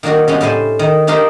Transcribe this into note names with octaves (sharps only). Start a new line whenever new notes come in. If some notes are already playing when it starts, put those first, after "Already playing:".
D#3 A#3 D4 F#4 A#4
C#3 G3 G#3 B3 C#4 D4
A2 C#4 E4 A4 C5 G#5
D#3
D4 D#4 F4 G4 A#4 C5